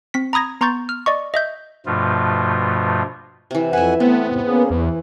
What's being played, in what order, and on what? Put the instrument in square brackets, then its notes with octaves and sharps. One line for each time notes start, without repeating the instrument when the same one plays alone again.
[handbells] C4 B6
A#5 B5 D#6 G#6 A#6
B3 A#5 C6 C#6 G6 A6
F6
D5 D#5 C#6
D#5 E5 G6
[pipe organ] G2 B2 F3 A3 F4
[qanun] C3 E3
[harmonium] F2 F#5 G#5 [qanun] B4 E5
[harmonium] A3 [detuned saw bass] B3 [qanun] C4
[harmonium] E2 G#2 C3
A#3 C#4 G#4
[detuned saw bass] E2 [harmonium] E3